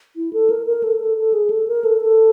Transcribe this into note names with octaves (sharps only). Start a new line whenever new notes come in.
E4
A4
A#4
A#4
A4
A4
A4
G#4
A4
A#4
A4
A4